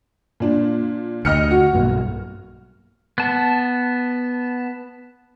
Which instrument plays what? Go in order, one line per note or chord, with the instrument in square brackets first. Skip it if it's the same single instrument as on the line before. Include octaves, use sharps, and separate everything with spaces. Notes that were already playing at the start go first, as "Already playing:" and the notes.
[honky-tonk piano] A#2 D4
[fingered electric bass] D2 [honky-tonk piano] D#5 F6 C#7
[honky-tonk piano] F#4
[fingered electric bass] B1 G2 A#3
[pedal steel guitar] B3 A5